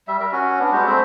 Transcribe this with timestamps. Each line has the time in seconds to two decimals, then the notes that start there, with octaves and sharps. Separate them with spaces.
0.08 G3 E5
0.20 A#4 E5
0.32 C#4 F#4
0.59 B3 D4
0.72 G3 G#3 F#4 G4
0.86 A3 C4 C5 E5